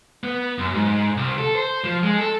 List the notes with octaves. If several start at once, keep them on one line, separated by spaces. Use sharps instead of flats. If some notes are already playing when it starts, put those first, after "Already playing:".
B3
F#2
G#2
C2
A4
C5
F3
G#3
A4